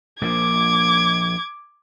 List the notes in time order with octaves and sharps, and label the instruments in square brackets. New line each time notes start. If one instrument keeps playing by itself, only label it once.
[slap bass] A#1 F3 A#3 [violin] D6 G#6